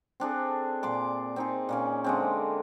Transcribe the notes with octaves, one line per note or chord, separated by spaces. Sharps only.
C4 D4 G#4 A4
A#2 C6 D6
C4 D#4 G#4
A#2 A#3 C#4
D3 G#3 C4